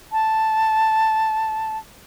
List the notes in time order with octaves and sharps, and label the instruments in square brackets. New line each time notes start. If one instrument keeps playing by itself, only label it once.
[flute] A5